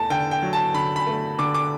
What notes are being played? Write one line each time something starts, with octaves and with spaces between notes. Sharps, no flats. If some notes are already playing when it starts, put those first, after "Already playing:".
Already playing: E2 A3 A5
D3 G5
G5
F#3
A5
D3 B5
B5
A3
D3 D6
D6